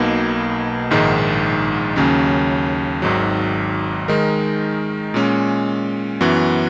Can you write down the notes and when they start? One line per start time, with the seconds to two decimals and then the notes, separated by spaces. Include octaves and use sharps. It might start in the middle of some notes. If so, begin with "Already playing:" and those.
Already playing: B1 B2 A#3 D#4
0.91 A#1 G#2 D#3 G#3 D#4
1.96 D#2 C#3 F#3 C#4
3.02 G#1 G#2 D#3 F#3
4.08 D#3 G#3 D#4 A#4
5.14 A#2 G#3 C#4
6.21 F#2 E3 B3 F#4